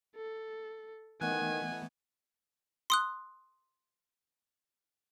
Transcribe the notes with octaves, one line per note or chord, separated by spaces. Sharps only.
A4
D#3 E3 A3 B3 D#5 F#5 G#5 F#6
C6 D#6 F#6